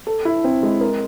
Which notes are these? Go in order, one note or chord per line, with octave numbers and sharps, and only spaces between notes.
A4
E4
C4
G#3
A#4